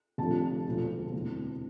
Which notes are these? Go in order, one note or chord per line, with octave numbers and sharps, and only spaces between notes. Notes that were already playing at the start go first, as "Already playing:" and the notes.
F1 F2 D3 A5
E1 D2 D3 F3
E1 D2 C3 E3